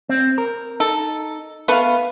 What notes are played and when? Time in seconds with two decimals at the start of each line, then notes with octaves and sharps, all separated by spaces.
0.09 C4
0.38 A#4
0.80 D#4 A4
1.68 A3 B3 B4 F5 C#6